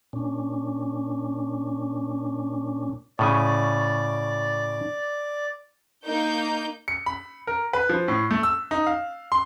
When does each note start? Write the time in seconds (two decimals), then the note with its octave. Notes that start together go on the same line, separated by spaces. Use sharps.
0.13 A#2 C#4 D4
3.19 A2 C#3 D5 G#5
6.06 A#3 D#4 G6
6.88 C#7
7.06 B5
7.47 A#4
7.73 B4
7.89 F3
8.08 A2
8.31 A3
8.43 E6
8.71 D#4
8.87 F5
9.32 C6